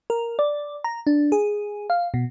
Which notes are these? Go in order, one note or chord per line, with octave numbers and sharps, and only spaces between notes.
A#4
D5
A#5
D4
G#4
F5
B2